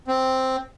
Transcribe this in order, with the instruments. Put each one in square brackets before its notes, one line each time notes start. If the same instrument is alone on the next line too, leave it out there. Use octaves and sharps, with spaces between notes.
[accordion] C4